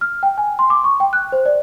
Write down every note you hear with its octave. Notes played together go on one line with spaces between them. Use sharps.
F6
G5
G#5
C6
D6
C#6
G5
F#6
C5
D5